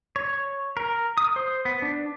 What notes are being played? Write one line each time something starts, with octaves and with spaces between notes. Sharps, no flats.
C#5
A#4
D#6
C5
B3
D4